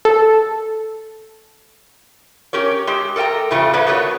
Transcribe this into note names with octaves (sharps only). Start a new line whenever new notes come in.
A4
C#4 G4 A#4 C#5
G#3 G4
A4 A#4 D5 G5 A#5
E2 A2 C#3 F3 G3 A3
A3 A#3 D4 E4 B4 D5
B3 F#4 A#4 B4 C#5